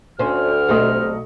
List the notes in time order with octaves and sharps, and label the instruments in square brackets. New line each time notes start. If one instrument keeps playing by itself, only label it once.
[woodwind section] D2 [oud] C4 C#4 [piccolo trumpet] F6
[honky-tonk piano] B1 A3 D#5 [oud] G3 C4